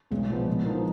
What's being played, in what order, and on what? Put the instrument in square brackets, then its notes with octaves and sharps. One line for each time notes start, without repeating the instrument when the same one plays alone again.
[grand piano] B1 [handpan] G#3
[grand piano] A#2 F3 B3
A#2
F3 B3 D#4 A#4